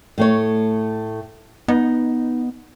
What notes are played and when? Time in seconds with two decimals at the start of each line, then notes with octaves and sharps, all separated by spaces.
0.18 A2 A3 C#5
1.68 B3 D#4